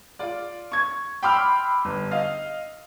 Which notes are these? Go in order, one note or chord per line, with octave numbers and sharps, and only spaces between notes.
F4 D5
C#6 G#6
G5 B5 C6 D6 E6 F6
G1
D#5 F5